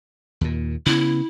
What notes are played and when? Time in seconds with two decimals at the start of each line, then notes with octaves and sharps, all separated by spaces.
0.41 D#2 A#2
0.86 C#3 B3 E4